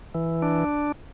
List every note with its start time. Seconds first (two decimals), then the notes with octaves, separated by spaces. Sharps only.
0.15 E3
0.42 D4